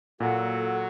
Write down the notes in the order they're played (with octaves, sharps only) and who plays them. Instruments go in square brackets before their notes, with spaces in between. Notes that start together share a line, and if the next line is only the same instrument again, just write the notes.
[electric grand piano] A#2 [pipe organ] F#3 [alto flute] A4 [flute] F#5